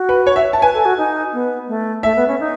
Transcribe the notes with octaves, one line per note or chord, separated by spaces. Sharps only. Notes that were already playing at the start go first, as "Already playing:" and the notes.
Already playing: F#4
B4
C#5
E5
A5
B4 G#5
A4
F#4
D#4
B3
A3
A3 E5
B3
C#4
D#4